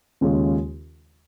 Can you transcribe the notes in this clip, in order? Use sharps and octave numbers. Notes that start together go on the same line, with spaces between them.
D#2 C#3 G#3 C#4 F4